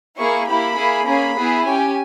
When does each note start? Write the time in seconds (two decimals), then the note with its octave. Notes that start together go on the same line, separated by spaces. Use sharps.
0.18 A#3 E4 G#4 C#6
0.48 A#3 E4 G4 B5
0.77 A#3 E4 G#4
1.07 A#3 C#4 G#4 B5
1.37 B3 E4 G#4
1.65 C#4 G4 G#5